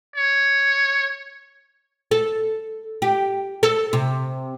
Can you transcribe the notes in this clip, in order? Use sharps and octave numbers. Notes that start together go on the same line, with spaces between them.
C#5
A4
G4
A4
C3